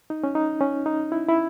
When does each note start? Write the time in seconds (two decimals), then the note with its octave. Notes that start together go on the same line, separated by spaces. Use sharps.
0.10 D#4
0.24 C#4
0.35 D#4
0.61 C#4
0.86 D#4
1.12 E4
1.28 E4